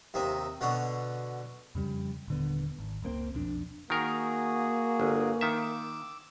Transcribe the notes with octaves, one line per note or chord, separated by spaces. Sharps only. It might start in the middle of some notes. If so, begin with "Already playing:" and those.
D#2 C3 D#4 E5
B2 D3 D4 C#5 F#5
F2 C#3 G3
D#1 D3 B3
G#1
F#1 C#2 A#3 C4
B1 F2 D4
D#3 A#3 F#4 G#4 A#4
G1
D#3 E5 D6 E6